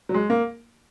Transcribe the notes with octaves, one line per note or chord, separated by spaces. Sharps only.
F#3
G#3
A#3